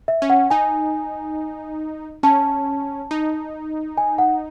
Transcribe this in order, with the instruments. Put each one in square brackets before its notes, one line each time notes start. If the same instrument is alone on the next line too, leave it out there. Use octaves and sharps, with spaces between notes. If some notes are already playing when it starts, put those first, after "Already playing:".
[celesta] E5
[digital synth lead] C#4
[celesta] F#5
[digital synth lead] D#4 [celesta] G#5
[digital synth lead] C#4 [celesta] A5
[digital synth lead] D#4
[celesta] G#5
F#5